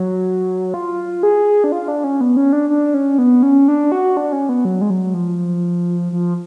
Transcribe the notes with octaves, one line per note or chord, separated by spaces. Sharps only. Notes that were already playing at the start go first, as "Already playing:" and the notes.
Already playing: F#3
F4
G#4
D4
F4
D4
C#4
B3
C#4
D4
D4
C#4
B3
C#4
D4
F#4
D4
C#4
B3
F#3
G#3
F#3
F3
F3